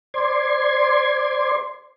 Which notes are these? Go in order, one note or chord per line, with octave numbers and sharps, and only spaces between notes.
C5 D5 C6 G#6